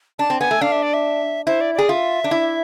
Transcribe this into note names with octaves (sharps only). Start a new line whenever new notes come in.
D4 A5
C4
B3 G#5
A3
D4 F5
E5
D5
E5
E4 C5
D5
G#4 D5
F4 E5
D4
E4